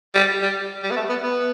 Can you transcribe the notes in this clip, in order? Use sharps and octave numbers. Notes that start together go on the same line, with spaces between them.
G3
G3
G3
B3
A3
B3
B3